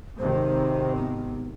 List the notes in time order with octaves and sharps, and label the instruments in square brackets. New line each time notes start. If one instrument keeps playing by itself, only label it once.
[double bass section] G#1 C3 D#3 [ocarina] C5
[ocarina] B3